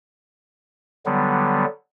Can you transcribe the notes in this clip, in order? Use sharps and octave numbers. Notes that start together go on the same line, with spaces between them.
D3 F#3 G3 B3